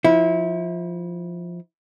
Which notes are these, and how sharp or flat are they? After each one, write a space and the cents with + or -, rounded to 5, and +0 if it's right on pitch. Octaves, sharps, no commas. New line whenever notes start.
F3 +0 E4 -25